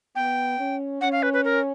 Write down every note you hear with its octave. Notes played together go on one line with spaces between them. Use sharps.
B3 G5
C#4
C#4 F#5
F5
B4
B4
A#4